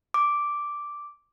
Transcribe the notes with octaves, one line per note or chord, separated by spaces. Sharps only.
D6